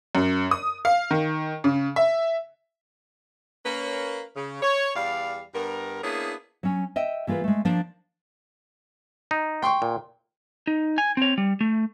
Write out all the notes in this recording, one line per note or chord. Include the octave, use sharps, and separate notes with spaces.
F#2
D#6
F5
D#3
C#3
E5
A#3 C#4 B4
C#3
C#5
E2 G3 D5 F5
G2 G3 B3 A#4
A#3 B3 C#4 D4 E4 G#4
F#3 C#4
D#5 E5 G5
E3 A#3 F4 G#4 B4
G#3 A3
F3 A#3 D4
D#4
G5 C6 C#6
A#2
D#4
G#5
C4 C#5
G3
A3